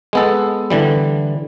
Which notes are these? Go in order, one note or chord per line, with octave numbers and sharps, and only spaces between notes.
G#3 B3 A4
D3 E3 G3